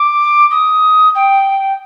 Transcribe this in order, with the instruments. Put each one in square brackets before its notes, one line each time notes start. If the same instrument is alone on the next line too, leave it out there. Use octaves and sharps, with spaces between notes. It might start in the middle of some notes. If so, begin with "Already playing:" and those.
Already playing: [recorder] D6
D#6
G5